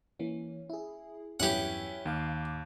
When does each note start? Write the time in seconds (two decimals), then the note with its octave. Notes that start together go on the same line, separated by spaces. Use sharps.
0.19 E3 A#3 C#4
0.70 E4 G#4
1.40 E2 G2 F#3 C#4 E4 G4 B4 F#5
2.05 D#2 D#3 F5 D6